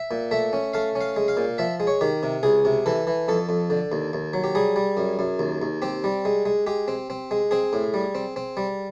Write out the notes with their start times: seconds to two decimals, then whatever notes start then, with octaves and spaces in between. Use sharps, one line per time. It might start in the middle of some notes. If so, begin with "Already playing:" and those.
Already playing: E5
0.11 A#2
0.31 A3 E5
0.53 C#4
0.74 A3 F5
0.95 C#4
1.01 F5
1.16 G#3
1.28 F5
1.37 A#2
1.58 F3 E5
1.80 G#3
1.87 C#5
2.01 D#3 G4
2.23 C3
2.43 C#2 G#4
2.65 C3
2.86 E3 A4
3.07 E3
3.28 F2 A4
3.49 F2
3.70 D3
3.92 D#2
4.13 D#2
4.33 F#3
4.44 G4
4.55 G3 G#4
4.76 G3
4.97 F#2
5.19 F#2
5.39 D#2
5.62 D#2
5.82 C4 G4
6.04 G3
6.25 G#3
6.46 G#3
6.67 G#3 G4
6.88 C4
7.10 C4
7.31 G#3
7.51 C4 G#4
7.73 A2
7.94 G3
8.15 C4
8.36 C4
8.57 G3